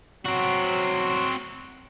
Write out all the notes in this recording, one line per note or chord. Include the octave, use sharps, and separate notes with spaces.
F#3 C4 F#4